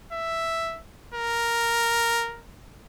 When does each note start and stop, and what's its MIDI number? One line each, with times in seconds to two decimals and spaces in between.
0.12 0.80 76
1.14 2.45 70